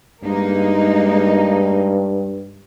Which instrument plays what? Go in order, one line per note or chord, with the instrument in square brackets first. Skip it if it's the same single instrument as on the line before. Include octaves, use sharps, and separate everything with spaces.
[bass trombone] G2 [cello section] G#3 A#3 D#4